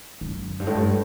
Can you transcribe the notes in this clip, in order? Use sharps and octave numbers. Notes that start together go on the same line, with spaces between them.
F#2
G2
A2
G2